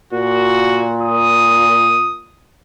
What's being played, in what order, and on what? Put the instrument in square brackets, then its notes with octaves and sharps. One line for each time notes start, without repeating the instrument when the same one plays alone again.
[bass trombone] A#2 [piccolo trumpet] F#4
[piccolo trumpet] D#6